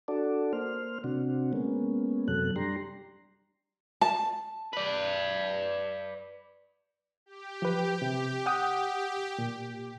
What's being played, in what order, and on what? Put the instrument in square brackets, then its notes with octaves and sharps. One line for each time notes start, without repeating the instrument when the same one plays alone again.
[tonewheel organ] D4 F#4 A4 D5
A#3 C5 F6
C3 C4 D4 F#4
G#3 A#3 B3 C#4
F#2 C3 F#3 A4 F#6
G3 D4 G4 A#5 C6
[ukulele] A5
[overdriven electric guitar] B4 D5
[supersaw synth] G4
[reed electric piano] F3 B4
C3
F#5 G5 D#6
A#2